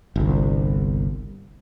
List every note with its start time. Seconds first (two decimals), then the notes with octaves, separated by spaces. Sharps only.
0.16 G1 C2